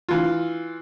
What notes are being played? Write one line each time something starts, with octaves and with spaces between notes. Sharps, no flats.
E3 F4